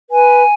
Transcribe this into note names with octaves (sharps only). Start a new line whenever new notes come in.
B4 G#5